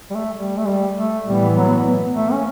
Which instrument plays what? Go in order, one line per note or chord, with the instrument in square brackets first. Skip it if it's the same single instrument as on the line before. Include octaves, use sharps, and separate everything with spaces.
[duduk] G3
A3
G3
A3
G3
A3
[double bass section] A2 E3 B3 [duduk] G3
[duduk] F#3
A3
C#4